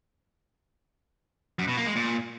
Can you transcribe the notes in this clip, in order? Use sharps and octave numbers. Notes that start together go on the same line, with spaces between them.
F#2
B2
A#3
G#3
A#2